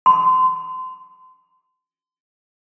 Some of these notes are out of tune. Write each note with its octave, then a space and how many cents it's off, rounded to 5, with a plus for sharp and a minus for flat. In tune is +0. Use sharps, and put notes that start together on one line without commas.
C6 -30